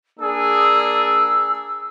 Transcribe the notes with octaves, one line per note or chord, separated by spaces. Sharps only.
A#3 D4 G#4 E6